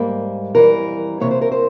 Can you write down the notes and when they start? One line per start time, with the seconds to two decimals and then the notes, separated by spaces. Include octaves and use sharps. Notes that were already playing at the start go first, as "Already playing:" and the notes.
Already playing: G#2 G3 A#3
0.55 F2 E3 G3 A#4
1.20 C3 E3 A#3 C#5
1.31 C5
1.42 A#4
1.52 C5